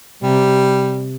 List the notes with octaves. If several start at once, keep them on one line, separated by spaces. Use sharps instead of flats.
C3 G3